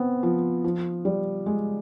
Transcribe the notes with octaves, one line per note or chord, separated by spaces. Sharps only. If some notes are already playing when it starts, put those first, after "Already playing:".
Already playing: B3 C4
F3
F3
G3
G#3